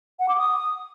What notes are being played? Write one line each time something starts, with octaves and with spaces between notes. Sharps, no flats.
F#5
D6
D#6